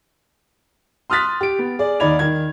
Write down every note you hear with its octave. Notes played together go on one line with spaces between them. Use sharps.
C6 D#6 F6 F#6 A6 B6
G4 D7
B3
G#4 D5
D#2 D#4 D5 B5 G#6 F7
D#3 G#6